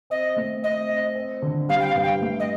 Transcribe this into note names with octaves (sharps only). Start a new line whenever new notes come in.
C4 D#5
A3
C4 D#5
C4
C4
D3
G3 F5
G5
F5
G2
G5
A3
D#5